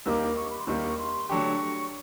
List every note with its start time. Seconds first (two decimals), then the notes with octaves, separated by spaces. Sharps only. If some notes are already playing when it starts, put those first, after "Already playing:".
0.06 D#2 D#3 G3 A#3 D6 E6
0.37 C#6
0.50 B5
0.59 C6
0.67 D#2 D#3 G3 A#3 C#6
0.99 C6
1.29 D3 F#3 A3 D4 G4 C#6